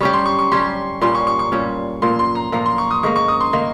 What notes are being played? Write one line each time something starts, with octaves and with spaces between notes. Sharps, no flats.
G3 C#4 G4 C#6
C6
C#6
C#6
G3 C#4 G4 C6
A#2 G3 C#4 C6
C#6
C#6
C#6
A#2 G3 C#4
A#2 F3 A#3 C6
C6
A#5
A#2 F3 A#3 A#5
C6
C#6
D#6
G#2 D#3 A#3 C#6
C#6
D#6
C6
D#3 A#3 C6